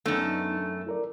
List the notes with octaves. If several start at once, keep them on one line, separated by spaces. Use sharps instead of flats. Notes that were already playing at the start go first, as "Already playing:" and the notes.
F#2 A3 B3 D4 D#4
E4 A#4 D5